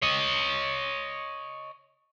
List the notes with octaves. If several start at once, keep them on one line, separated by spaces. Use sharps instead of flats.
C#5 D#5